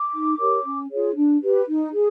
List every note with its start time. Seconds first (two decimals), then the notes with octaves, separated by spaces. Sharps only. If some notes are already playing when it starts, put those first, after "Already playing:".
Already playing: D6
0.14 D#4
0.39 G4 A#4 C#5
0.65 C#4
0.91 F4 G#4 C#5
1.16 D4
1.42 G4 B4
1.68 D#4
1.93 G#4